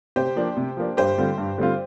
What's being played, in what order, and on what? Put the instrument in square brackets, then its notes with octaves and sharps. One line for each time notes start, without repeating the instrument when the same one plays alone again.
[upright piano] C3 [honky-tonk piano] G4 C5
[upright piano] F3 A#3 D4
C3
F3 A#3 D4
[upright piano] G2 [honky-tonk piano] G4 C5
[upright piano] D3 G3 C4 F4
G2
D3 G3 C4 F4